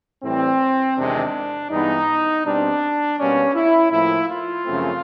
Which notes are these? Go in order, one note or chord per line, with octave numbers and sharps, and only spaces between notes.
A2 E3 G3 C4
E2 C3 D#3 G#3 C4 D4
G2 E3 G#3 B3 D#4
B2 G3 C4 D4
B2 G3 A#3 C#4
E4
A2 F3 A#3 E4
F4
F#2 C#3 F3 A3 C4